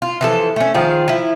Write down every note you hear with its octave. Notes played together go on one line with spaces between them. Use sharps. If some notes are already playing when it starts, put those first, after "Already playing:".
F4
E3 F3 A4
A3 C#4
D#3 F3 F4 G#4
F3 E4